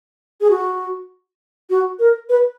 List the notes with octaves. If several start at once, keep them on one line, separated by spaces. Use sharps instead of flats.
G#4
F#4
F#4
A#4
B4